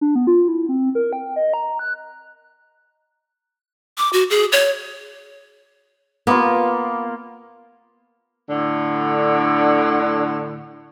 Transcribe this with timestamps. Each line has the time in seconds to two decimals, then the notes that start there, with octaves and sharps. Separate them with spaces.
0.01 D4
0.15 B3
0.27 F4
0.48 E4
0.69 C4
0.95 A#4
1.13 G5
1.36 D#5
1.54 A#5
1.79 F#6
3.98 D6
4.13 F#4
4.30 G#4
4.52 C#5
6.27 A#3 B3 F4
8.50 A2 D3